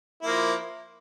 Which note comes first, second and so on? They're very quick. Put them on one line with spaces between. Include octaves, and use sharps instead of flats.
E4 A#3 F3